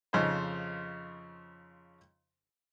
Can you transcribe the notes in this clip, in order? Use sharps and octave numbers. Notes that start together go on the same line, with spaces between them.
F2 C#3 D#4 C5